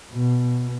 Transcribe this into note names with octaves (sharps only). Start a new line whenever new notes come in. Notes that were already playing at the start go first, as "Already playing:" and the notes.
B2